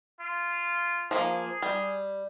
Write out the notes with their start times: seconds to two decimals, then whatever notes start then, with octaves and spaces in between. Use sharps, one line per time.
0.20 F4
1.11 F3 A#3 G#4
1.62 G3